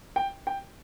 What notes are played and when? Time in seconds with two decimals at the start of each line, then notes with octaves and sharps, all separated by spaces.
0.16 G5
0.47 G5